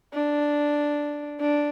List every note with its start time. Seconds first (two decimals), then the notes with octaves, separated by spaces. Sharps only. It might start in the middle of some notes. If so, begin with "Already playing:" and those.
0.13 D4
1.40 D4